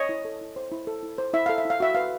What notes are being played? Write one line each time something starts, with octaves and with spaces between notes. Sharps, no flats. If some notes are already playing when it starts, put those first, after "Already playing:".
Already playing: C#5 D#5
E4
A4
E4
C5
E4
A4
E4
C5
E4 E5
A4 F5
E5
E4 F5
F#4 E5
B4 F5